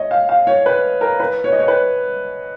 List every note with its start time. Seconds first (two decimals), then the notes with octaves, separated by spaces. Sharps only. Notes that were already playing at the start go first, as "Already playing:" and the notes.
Already playing: C#5 D#5
0.11 F5
0.29 F5
0.47 C#5
0.66 B4
1.01 A#4
1.20 B4
1.44 C#5
1.52 D#5
1.60 C#5
1.68 B4